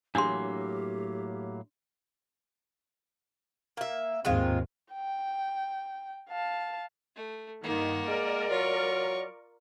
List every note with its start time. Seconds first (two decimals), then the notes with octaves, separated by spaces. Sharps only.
0.15 A2 F#3 A#3 D4 G4 C6
3.77 A#3 E5
4.25 D#2 G#2 D#3 G#3 C4 F4
4.93 G5
6.29 F5 A5
7.16 A3
7.63 G2 D#3 A#3 F#5
8.08 G#3 A#4 D5
8.51 F#3 F4 C#6